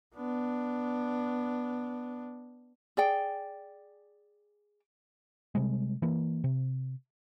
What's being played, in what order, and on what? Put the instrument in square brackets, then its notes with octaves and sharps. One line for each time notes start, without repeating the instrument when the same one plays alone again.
[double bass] B3 D4
[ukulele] G#4 D5 G5
[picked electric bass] C3 G3 G#3
E3 A#3
C3